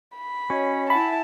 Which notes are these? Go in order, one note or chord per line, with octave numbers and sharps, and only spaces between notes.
B5
C#4 F#4 C#5 D#5
E4 E5 F#5 G#5 A5 B5